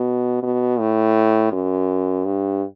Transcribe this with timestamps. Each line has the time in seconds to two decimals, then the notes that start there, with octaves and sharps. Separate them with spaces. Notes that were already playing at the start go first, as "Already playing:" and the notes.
Already playing: B2
0.43 B2
0.79 A2
1.52 F#2
2.25 G2